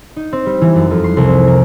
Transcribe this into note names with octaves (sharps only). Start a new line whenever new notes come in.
D#4
C4
G3
E3
F#2
F2
C6
C2
C4
A#4